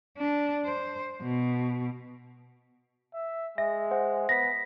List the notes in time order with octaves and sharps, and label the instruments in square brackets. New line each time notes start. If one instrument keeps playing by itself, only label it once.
[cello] D4
C5
B2
[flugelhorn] E5
[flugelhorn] G#3 [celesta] E5 [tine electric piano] A#6
[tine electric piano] C5 F#5
[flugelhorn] B3 [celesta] A#6 B6